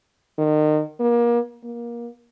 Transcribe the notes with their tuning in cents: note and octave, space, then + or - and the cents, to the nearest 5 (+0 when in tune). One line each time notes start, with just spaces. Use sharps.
D#3 -30
A#3 +30
A#3 +25